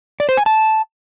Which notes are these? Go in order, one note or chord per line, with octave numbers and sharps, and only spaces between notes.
D5
C5
G#5
A5